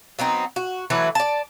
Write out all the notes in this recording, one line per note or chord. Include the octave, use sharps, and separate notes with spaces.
F#3 B3 C4 D#4
F#4
E3 F#3 A3 B4
D5 A5